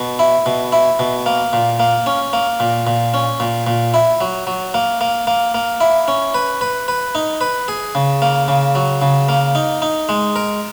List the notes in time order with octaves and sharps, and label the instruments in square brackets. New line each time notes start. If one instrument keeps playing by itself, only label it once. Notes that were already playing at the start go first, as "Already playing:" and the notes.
Already playing: [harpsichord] B2
E4
B2
E4
B2
A#3
A#2
A#3
C#4
A#3
A#2
A#2
C#4
A#2
A#2
E4
F#3
F#3
A#3
A#3
A#3
A#3
E4
C#4
B4
B4
B4
D#4
B4
G#4
C#3
A#3
C#3
F#3
C#3
A#3
D#4
D#4
G#3
A#4